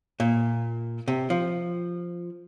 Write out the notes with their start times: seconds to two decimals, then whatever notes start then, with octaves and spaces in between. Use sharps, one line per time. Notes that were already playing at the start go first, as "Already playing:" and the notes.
0.20 A#2
1.08 C3
1.30 F3